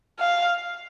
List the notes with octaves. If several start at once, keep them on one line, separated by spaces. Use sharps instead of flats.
F5